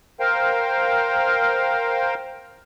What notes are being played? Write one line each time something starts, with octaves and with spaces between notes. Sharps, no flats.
A#4 C5 F5 G5